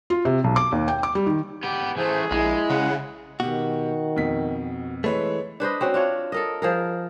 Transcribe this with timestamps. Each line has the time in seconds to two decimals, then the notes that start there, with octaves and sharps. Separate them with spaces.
0.10 F4
0.25 C3
0.44 B1
0.56 D6
0.72 D#2
0.88 G5
1.03 D6
1.15 G3
1.27 D#3
1.63 B3 G4
1.97 E3 A3 G#4 C5 G6
2.31 A#1 G#3 E4
2.70 C#3 F#5
3.40 B2 D#3 F#4 G4
4.16 F2 B2 B6
5.04 E3 G#3 A3 B4 C#5
5.60 D4 B4 C5 D#5
5.81 C4 C#4 F#4
5.94 D4 F4 C#5
6.32 A4 A#4 D#5
6.62 F3 G#4 A#4